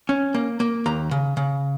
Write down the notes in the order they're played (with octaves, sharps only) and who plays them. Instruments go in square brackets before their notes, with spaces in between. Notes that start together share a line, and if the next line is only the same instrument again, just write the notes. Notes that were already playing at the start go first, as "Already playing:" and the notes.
[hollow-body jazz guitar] C#4
A#3
A#3
D#2 A#5
C#3
C#3